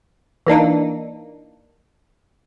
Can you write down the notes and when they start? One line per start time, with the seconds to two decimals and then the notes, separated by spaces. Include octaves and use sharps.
0.47 E3 A#3 D4 D#4